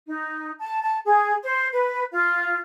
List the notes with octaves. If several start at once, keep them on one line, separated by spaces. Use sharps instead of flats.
D#4
A5
A5
G#4
C5
B4
F4